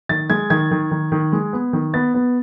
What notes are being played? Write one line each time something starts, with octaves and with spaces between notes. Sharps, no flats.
D#3 A6
G#3 G#6
D#3 G#6
D#3
D#3
D#3
G#3
B3
D#3
B3 A6
B3